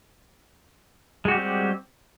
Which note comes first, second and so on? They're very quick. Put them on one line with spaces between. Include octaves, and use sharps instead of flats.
G#3 F#4 G4 G3 C4